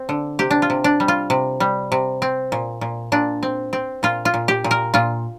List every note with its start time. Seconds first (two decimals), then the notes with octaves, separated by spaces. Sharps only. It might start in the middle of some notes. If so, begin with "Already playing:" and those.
Already playing: C4
0.09 D3
0.39 C3 G4
0.51 D4
0.62 F4
0.70 C3
0.84 D4
1.00 G3
1.08 F4
1.30 C3
1.60 G3
1.92 C3
2.22 C4
2.52 A#2
2.81 A#2
3.12 A#2 D4
3.43 C4
3.73 C4
4.03 A#2 F4
4.25 F4
4.34 A#2
4.48 G4
4.64 A#2
4.71 A#4
4.94 A#2 F4